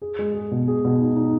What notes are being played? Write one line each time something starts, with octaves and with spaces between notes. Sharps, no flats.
G#4
G#3
G#4
B2
G#4
B2
D#4
D#4